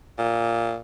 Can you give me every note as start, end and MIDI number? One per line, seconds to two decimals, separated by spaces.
0.18 0.77 46